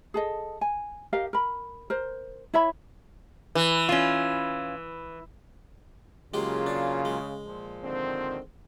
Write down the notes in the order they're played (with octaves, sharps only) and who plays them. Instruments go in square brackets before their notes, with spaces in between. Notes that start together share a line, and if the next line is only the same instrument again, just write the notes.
[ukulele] G#4 A4 D#5
G#5
G4 A#4 D#5 F5
A#4 B5
A#4 C5
E4 C#5 E5 B5
[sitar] E3
[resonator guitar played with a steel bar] C#4 F4
[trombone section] C#3 [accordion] F#3 A#3 F4 [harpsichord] G#3 G4 G#4
[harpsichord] D4
G#3
[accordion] A#2 F3
[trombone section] D3 D#3 C4